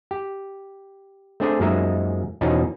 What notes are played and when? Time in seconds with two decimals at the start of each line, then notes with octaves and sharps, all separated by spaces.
0.11 G4
1.40 A3 C4 D4 G#4 C5 D5
1.60 F#2 F3 G#3 A#3 D#4 E5
2.41 E2 B2 F3 C#4 D#4